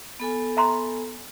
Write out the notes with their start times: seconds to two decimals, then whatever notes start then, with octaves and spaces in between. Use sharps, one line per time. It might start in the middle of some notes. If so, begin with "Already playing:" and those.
0.20 B3 A4 G#5
0.57 E5 A#5 C6